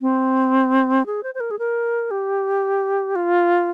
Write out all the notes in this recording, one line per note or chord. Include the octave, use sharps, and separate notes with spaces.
C4
G#4
C5
C5
A#4
G#4
A#4
G4
F4